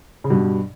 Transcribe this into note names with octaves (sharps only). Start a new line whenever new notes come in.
C#3
G2 B2